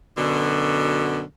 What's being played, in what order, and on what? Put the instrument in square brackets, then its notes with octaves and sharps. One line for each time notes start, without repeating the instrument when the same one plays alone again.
[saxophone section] F#2 B2 D3